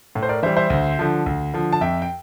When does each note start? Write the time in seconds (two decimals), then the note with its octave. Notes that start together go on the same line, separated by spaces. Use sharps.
0.15 A2
0.23 C5
0.29 A#4 D5
0.43 E3 G3 C5 E5
0.57 C5 E5
0.70 D2
0.99 D3 F3
1.26 D2
1.54 D3 F3
1.73 A5
1.81 F2 E5 G5
2.02 G5